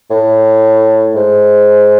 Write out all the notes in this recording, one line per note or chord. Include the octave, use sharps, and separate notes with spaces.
A2
G#2